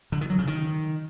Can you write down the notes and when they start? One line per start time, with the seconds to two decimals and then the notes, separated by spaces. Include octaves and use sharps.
0.12 D3
0.21 D#3
0.30 F#3
0.38 C#3
0.47 D#3